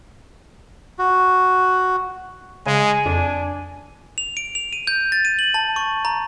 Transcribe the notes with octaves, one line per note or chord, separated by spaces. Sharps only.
F#4
C#3 G#3 G#5
F2 D4
F7
D7
F7
D#7
G6
A6
D#7
F#7
A5
C#6
A#5